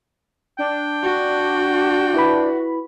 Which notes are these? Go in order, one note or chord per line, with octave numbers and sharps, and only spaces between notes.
D4 G5
F#4
E4 B4 B5